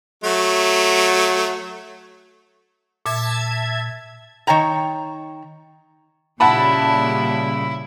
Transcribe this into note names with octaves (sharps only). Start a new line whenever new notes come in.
F#3 A3
A#2 E5 A5 G#6
D#3 C#5 G5 A#5
A#2 C#3 G3 E4 F#5 A5 B5